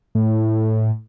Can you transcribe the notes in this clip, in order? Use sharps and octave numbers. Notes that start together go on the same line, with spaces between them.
A2